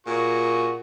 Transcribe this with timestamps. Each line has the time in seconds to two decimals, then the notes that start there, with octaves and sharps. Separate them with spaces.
0.07 A#2 F#4 G#4 C#6